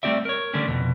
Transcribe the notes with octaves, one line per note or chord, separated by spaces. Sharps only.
G3 A3 C4 F#4 D5 E5
A#4 C#5
D3 G3 A3 C#4 D4
C2 F2 B2